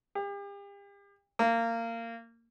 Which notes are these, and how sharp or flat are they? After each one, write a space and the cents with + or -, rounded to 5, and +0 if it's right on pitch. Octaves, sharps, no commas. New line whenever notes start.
G4 +40
A#3 -20